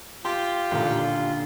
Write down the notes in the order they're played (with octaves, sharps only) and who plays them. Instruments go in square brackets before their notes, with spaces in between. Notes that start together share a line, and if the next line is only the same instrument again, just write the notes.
[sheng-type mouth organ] F4 [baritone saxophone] G4 [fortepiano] C6
[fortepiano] A1 D#2 A#2 [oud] D3